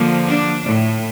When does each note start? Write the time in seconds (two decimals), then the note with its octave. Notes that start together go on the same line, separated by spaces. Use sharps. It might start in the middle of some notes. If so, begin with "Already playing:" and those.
Already playing: D3 F3 A#3
0.28 D4
0.63 A2 A3